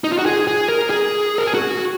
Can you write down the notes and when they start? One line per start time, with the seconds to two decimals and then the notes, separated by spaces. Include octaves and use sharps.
0.04 D#4
0.11 F4
0.19 F#4
0.26 G#4
0.47 G#4
0.68 A#4
0.90 G#4
1.38 A#4
1.46 G#4
1.54 F#4